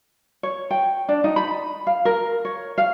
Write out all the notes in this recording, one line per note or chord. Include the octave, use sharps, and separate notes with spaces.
C#5
G5
D4
D#4
B5
F5
A#4
C#5
F5